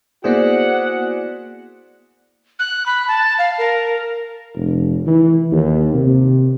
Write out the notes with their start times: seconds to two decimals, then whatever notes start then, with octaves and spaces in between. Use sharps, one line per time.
0.24 A#3 B3 E4 F#4 G#4 C5 D5 F#5
2.59 F#6
2.86 B5
3.08 A5
3.39 F5
3.58 A#4
4.55 F1
5.06 E3
5.52 D#2
5.94 C3